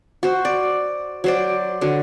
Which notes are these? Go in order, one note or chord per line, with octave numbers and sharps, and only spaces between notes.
F#4 C5
D5
F#3 C5 D5
D3 F#3